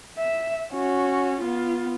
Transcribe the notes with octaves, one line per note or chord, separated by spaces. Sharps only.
E5
C#4 F#4
B3 F4